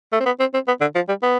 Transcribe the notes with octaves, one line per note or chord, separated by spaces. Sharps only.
A3
C4
B3
C4
C4
B3
D3
F3
G3
B3